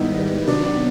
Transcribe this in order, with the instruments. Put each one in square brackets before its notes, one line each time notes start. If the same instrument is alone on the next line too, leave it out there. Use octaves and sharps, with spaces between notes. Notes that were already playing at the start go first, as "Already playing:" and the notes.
Already playing: [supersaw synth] G#2 D#3 G3 B3 [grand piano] D#4 E4
[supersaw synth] C3 D#3 F#3 B3 [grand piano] D4
[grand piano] D4